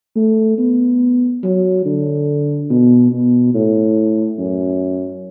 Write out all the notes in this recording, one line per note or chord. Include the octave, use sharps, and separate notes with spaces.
A3
B3
F#3
D3
B2
B2
A2
F#2